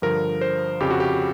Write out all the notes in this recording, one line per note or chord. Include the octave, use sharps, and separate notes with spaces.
G2 D3 F3 A#4
C5
F2 C#3 F3 G4
F#4
G4